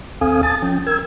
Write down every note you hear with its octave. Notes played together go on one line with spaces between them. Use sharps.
D#2 C4 A4 F5 G#5 D#6
G#5 A5 D#6 A6
F3 C#4 G5
A#4 E6 G#6